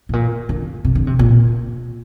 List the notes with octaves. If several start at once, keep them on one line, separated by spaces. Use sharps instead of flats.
A2
A#2
D3
C3
D3
C3
A#2